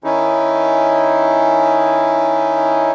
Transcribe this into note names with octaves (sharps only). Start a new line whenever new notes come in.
D#3 C#4 D#4 E4